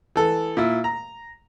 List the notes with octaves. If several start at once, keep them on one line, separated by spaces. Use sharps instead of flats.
E3 A4
A#2 E4
A#5